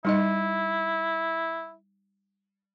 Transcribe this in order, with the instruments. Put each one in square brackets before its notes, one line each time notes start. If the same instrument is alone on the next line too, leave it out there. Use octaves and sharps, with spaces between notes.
[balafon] G3 D#4 D#5 [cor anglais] E4